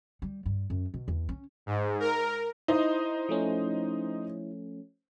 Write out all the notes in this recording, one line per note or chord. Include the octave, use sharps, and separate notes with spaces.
G3
G2
F#2
B2
E2
C#4
G#2
A#4
D#4 E4 C5 D#5
F3 A3 C#4